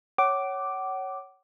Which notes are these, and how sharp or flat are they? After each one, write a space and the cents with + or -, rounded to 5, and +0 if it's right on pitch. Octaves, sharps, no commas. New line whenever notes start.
C#5 +0 F#5 +35 D6 +0